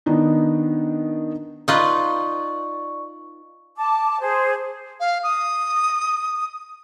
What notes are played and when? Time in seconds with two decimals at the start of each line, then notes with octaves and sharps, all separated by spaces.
0.06 D#3 B3 D4 D#4
1.68 D#4 F4 B4 D5 C#6
3.76 A5 D6
4.20 G#4 C5
5.00 F5
5.23 D#6